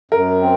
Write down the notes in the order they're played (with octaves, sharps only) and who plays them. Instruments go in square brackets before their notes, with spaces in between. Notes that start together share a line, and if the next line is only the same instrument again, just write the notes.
[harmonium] F#2 [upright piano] A#4
[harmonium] C4